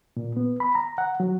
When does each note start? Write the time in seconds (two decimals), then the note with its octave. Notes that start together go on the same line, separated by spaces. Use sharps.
0.17 A#2
0.37 B3
0.60 B5
0.75 A#5
0.98 F#5
1.20 F#3